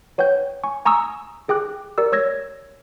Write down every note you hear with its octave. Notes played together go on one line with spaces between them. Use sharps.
B4 C#5 F#5 G5 G6
G#5 C#6
G#5 A#5 C#6 D#6 E6
G4 G#4 G5 D6 F#6
G4 A#4 D5 E6
C#5 E6 G#6 A#6